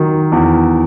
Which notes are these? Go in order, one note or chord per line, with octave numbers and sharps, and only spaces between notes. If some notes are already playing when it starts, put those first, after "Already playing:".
Already playing: D#3 F#3
E2